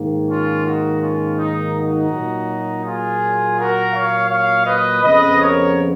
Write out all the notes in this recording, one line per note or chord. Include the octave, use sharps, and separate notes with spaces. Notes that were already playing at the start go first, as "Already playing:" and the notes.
Already playing: G#2 D#3 A#3
C#4 F4
D#4 F#4
C#4 F4
D#4
D#4 F#4
A#2 F#3 A#3
F4 G#4
F#4 A#4
C#5 F5
C#5 F5
B4 D#5
F2 C#3 F3 B3 B4 D#5
A#4 C#5